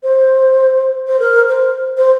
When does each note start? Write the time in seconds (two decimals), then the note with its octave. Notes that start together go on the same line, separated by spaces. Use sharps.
0.03 C5
1.07 C5
1.19 A#4
1.49 C5
1.97 C5